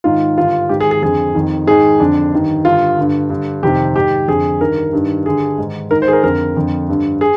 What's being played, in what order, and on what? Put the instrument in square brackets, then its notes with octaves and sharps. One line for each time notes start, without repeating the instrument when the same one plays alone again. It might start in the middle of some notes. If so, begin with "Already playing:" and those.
[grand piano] G#2 D#3 F4
G2 D3 F4
G#2 D#3 G4
G#4
G#4
F2 D3 G#4
F2 D#3
G#2 D#3 G#4
F2 D3 D4
G2 D#3
G2 D3 F4
G2 D3
G2 D3
F2 C3 D#3 G4
G#2 D#3 G4
F2 D3 G#4
G2 D#3 A#4
G2 D#3
G2 D3 G#4
G#2 D#3
G#2 D#3 A#4
C5
G#4
A#4
F2 D3 A#4
F2 D3
G2 D3
G#4